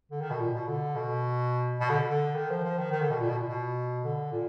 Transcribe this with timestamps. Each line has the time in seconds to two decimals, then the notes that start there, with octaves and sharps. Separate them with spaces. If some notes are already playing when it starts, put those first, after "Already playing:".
0.11 D3
0.21 D#3
0.30 B2
0.40 A#2
0.54 B2
0.67 D3
0.95 B2
1.80 B2
1.89 D3
2.08 D3
2.35 D#3
2.50 F3
2.63 F3
2.78 D#3
2.92 D#3
3.01 D3
3.10 B2
3.20 A#2
3.29 B2
3.38 A#2
3.48 B2
4.04 D3
4.32 A#2